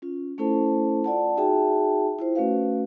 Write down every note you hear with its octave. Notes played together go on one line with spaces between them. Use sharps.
C#4 F4
A3 C#4 E4 A4 C5 A5
F4 D5 F#5 A5
D#4 F#4 G#4 E5 G5 A5
E4 F4 C5
A3 C#4 F#4 B4 F5